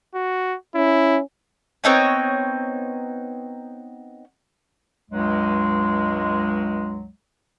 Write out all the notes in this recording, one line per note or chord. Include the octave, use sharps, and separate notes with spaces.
F#4
C#4 E4
B3 C4 D#4 C#5
C#2 G2 F#3 G#3